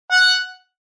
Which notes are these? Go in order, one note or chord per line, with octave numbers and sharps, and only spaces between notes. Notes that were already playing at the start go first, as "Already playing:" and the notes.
F#5